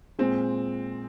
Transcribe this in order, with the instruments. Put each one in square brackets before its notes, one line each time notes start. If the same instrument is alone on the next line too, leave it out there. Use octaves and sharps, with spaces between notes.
[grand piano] A#2 G#3 C4